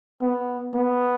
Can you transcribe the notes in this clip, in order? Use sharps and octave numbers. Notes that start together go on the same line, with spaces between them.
B3
B3